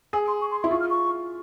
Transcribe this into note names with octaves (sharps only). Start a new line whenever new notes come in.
G#4 G#5
C6
C#6
C6
E4 C6
F4 C#6
F6
C#6